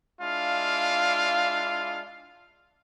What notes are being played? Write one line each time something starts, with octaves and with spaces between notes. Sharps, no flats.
G#3 D4 E4 F4 F5